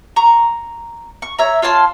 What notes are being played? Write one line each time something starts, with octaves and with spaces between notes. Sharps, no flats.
A#5 C#6
C#6
C#5 E5 A#5
F4 C#5 A5 C6